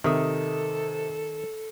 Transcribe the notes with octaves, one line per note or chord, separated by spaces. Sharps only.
C3 D#3 A4 E5 D#6